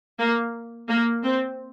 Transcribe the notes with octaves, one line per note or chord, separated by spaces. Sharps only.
A#3
A#3
C4